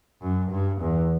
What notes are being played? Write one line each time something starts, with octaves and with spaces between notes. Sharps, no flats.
F#2
G2
E2